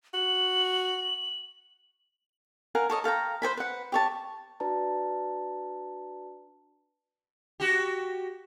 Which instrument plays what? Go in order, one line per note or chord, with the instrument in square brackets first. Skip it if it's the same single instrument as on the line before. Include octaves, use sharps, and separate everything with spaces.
[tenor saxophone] F#4 [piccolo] F#7
[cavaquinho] A#4 F5 F#5 G#5
A4 C#5 D#5
A4 F5 G5 A#5
B4 C5 G#5 B5
B4 F#5
G4 C#5 A5
[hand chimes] D4 F#4 B4 D5 A5 A#5
[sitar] F#4 G4